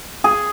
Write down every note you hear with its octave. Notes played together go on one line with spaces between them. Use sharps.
G#4